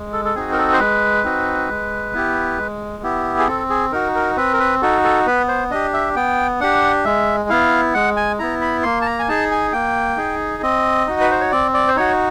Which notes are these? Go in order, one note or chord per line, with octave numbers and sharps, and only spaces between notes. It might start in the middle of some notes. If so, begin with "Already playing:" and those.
Already playing: G#3
A4
A4
C4 D#4 F#4 G#4
A#4
A4
C5
G#3 B4
C4 D#4 F#4
G#3
B3 E4 G4
G#3
B3 E4 G4
G#4
C4 A4
G#4
D#4 F#4 A#4
A#4
C4 B4
A#4
B4
D#4 F#4 A4
A4
B3 B4
C5
D4 G4 D#5
E5
B3 G5
D4 G4 F#5
G#3 E5
B3 E4 F5
G#3 F#5
G#5
B3 E4 A#5
B5
A#3 C6
A5
A#5
G#5
D#4 G#4 A5
G#5
A#3 G5
D#4 G#4
C4 D#5
D#4 F#4
B4
C5
C#5
C4 D5
D5
C5
D#4 F#4 C#5